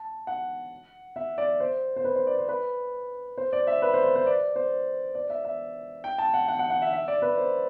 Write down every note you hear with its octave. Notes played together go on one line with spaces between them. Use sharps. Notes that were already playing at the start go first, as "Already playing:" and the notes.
Already playing: A5
F#5
E5
D5
C5
C5
B4
C5
D5
C5
B4
C5
D5
E5
B4
C5
C5
C5
D5
C5
D5
E5
E5
G5
A5
F#5
F#5
F#5
F#5
E5
E5
D5
B4
C5